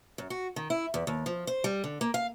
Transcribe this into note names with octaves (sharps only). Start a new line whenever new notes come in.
F#2
F#4
D#3
E4
E2
D#2
F3
C5
G3
D3
A#3
F5